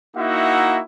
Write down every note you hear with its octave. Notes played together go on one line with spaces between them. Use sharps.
A#3 D#4 E4 F#4 E5 F#5